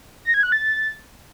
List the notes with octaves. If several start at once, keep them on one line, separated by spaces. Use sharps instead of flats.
A#6
G#6
F#6
A6